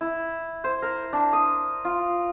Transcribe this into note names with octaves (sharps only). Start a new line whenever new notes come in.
E4
C5
A#4
D4
D#6
F4